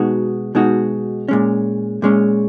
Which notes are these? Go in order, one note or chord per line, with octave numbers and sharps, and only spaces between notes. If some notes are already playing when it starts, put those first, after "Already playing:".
Already playing: B2 G#3 D#4 F#4
B2 G#3 D#4 F#4
A#2 G#3 C#4
A#2 G#3 C#4